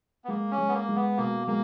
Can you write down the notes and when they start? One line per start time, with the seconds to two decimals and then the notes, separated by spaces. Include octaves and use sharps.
0.25 B3
0.28 G#3 A#3
0.51 C#4
0.58 G#3
0.69 B3
0.73 A#3
0.89 G#3
0.96 B3
1.17 B2 A#3
1.47 G#3 A#3